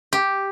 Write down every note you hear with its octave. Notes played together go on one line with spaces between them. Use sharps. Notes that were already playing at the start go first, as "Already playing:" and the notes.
G4